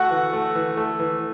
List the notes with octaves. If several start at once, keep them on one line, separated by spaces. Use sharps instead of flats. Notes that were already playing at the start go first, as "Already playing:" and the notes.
Already playing: A3 F#4 F#5
E3
A3
E3
A3
E3